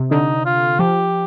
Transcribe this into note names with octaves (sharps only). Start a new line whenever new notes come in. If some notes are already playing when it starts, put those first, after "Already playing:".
Already playing: C3
D3 D#4
F4
F3 G4